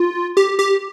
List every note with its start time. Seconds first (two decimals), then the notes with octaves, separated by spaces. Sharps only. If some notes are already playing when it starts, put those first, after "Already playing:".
Already playing: F4
0.37 G4
0.59 G4